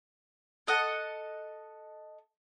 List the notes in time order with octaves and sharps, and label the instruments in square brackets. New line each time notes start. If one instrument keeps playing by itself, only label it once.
[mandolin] A4 D#5 F#5 A5